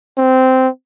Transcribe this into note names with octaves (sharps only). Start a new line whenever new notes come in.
C4